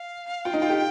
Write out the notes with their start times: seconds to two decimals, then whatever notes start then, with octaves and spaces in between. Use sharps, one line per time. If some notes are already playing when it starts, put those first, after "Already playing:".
Already playing: F5
0.45 F4 G5
0.54 D#4
0.62 F4
0.70 G4